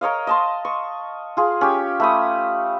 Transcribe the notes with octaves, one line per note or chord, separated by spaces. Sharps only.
A#4 C#5 D#5 F5
D#5 A5 C6
C#6
F4 G#4
C#4 G4
A3 B5 D#6